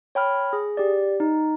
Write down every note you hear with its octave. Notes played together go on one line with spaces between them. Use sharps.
C#5 G5 B5 F6
G#4
G4 D5
D#4